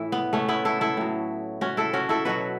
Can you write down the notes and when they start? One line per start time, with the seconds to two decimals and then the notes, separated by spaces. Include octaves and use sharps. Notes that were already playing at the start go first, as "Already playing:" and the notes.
Already playing: A2 E3 E4
0.12 B3
0.33 A3 C#4
0.48 B3 E4
0.65 E4 A4
0.81 E4 A4
0.97 A2 F#3
1.61 C#4 F#4
1.77 E4 A4
1.93 C#4 F#4
2.09 E4 A4
2.25 B2 F#3 F#4 B4